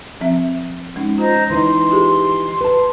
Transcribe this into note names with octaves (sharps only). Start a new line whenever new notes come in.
F3 C4 E5
G#3 C#4 D#4
F4 C5 D#5 A#5
E3 C#4 D#4 C6
F4 G4 G#4
B4 A5